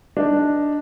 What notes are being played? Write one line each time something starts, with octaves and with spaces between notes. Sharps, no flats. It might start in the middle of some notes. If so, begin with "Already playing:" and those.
D4 D#4